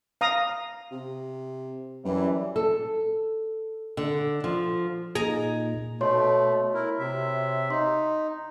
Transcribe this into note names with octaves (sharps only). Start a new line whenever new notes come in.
F5 A#5 D#6
C3
F#2 E3 G3
A4
D3
F3
A#2 D#4 G#4 G#5 A#5
B2 A3 F#4 C#5 C6
E4 A#4
C3 E5
D#4 C6